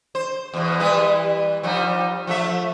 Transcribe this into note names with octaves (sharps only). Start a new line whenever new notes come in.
C5
E2 B2
E3 G3 B4
F3 G3 D#4
F3 A3 E5